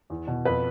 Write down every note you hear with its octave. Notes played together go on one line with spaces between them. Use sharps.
E2
B2
F2 B4